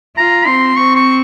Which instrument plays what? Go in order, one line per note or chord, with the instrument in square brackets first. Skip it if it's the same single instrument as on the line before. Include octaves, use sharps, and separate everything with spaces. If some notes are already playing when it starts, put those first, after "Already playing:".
[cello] F4 [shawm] A#5
[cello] C4 [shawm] C6
[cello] C4 [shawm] C#6
[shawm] C#6